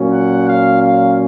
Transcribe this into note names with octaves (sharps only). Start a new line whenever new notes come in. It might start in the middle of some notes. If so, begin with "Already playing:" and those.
Already playing: A#2 F#3 C#4
F#5
F5
F5